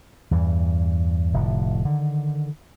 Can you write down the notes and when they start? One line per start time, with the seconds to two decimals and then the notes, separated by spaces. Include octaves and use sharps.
0.31 E2 G2 E3
1.34 F1 A2 D3
1.85 D3 D#3